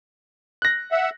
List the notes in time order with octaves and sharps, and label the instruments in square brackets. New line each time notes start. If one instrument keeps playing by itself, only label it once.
[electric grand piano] F#6 A#6
[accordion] E5 F#5